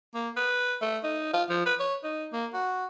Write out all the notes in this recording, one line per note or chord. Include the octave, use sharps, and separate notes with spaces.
A#3
B4
A3
D#4
F4
F3
B4
C#5
D#4
A#3
F#4